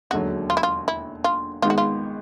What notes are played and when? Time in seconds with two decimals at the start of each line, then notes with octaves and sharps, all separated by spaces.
0.11 E1 D#2 D3 F#3 F#4
0.50 F4
0.57 E4
0.63 F4
0.88 E4
1.24 F4
1.62 G#1 G#2 D#3 G#3 B3 F4
1.70 F#4
1.78 F4